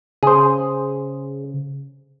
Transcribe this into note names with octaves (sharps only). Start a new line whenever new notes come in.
C#3 G#4 C5